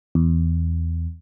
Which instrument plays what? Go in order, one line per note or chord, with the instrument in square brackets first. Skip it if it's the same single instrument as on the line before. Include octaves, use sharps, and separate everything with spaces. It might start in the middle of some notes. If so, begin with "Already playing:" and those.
[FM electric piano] E2